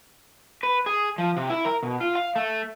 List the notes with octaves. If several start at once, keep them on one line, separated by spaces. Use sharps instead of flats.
B4
G#4
F3
C3
E4
A#4
B2
F4
F5
A3